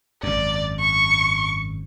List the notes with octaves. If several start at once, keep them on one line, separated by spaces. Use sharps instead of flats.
G#1 F#2 D5
C#6